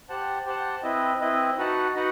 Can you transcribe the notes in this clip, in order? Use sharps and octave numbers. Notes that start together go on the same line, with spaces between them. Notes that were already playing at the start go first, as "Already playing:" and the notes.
G4 C5 F#5 A5
G4 C5 F#5 A5
C4 E4 B4 D#5
C4 E4 B4 D#5
D#4 F#4 B4 F#5 A5
D#4 F#4 B4 F#5